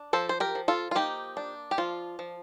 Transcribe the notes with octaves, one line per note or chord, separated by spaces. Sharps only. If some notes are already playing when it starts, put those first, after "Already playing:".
Already playing: D4
F3 A4 C5
C5
G4 A#4
F3
F4 A4
F4
A#3 D#4 G4
D4
G4
F3 F4
F3